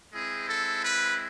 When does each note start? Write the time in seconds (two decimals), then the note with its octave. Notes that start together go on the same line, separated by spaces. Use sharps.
0.12 G#3 C4 E4 G#4
0.48 A4
0.83 B4